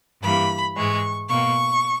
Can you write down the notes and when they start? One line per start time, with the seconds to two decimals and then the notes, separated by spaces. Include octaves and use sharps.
0.22 G2 E3 G3 A#3 B5
0.76 G#2 E3 G#3 C#6
1.30 B2 A#3 C#6